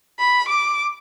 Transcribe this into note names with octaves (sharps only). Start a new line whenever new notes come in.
B5
D6